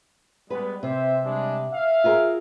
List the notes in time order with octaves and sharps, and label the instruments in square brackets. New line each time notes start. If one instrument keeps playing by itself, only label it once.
[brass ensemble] G3 G#3 B3 [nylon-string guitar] B4
[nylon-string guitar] C3 [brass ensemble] C4 C5 E5
[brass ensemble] G3 G#3 D4
E5 F5
[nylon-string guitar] F4 G#4 A#4